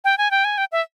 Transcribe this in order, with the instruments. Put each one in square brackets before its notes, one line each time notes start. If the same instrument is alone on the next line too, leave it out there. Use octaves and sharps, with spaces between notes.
[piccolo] G5
G#5
G5
G#5
G5
E5